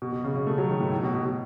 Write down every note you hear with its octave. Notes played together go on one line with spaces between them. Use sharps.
B2
B2
C#3
C#3
A3
F#3
D#3
A2
A2
B2
B2
B2